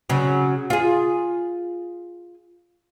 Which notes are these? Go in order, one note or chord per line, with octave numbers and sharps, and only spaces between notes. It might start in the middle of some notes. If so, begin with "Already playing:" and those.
C#3 F#3
F4 G#4